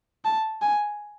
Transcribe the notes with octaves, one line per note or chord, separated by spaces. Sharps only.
A5
G#5